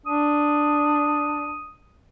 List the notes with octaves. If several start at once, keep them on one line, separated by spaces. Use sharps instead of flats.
D4 D#6